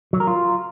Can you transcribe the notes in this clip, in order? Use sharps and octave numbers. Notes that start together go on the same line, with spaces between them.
F#3
A#4
F4